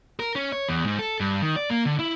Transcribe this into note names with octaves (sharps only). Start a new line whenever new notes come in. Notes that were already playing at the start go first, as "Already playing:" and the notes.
A#4
C#4
C#5
E2
G#2
A4
G2
D#3
D5
A#3
D3
E4